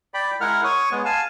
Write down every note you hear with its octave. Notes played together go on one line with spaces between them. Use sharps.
D5 G5 B5
G#3 E4 A#4 F#5 F6
C#5 C#6 D#6
G#3 B3
F5 G#5 A5